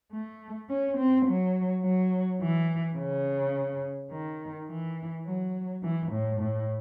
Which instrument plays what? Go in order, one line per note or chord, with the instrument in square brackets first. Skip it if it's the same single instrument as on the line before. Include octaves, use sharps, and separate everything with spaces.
[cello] A3
C#4
C4
F#3
F#3
E3
C#3
D#3
E3
F#3
E3
A2
A2